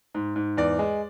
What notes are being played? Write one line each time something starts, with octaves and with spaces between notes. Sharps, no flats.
G#2
G#2
E2 D5
G#3